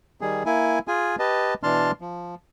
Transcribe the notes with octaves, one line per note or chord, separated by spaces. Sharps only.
D#3 G3 G#4
A#3 E4 G#5
F4 G#4 G#5
G4 B4 D#5 A5
B2 E3 D4 A5 C6 F6
F3